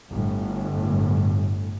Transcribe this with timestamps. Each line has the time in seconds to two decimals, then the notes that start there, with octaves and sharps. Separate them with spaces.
0.10 G1 A2